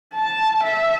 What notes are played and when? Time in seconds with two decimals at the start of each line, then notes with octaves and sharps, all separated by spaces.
0.15 A5
0.64 E5